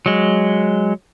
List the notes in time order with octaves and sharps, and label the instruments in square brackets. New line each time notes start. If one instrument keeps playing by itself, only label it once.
[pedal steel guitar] F#3 G#3